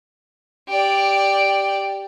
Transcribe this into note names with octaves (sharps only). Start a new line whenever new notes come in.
G4 D5